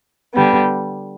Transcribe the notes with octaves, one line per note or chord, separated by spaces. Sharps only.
D3 G3 B3